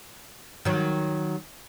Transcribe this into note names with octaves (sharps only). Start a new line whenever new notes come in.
D#3 F#3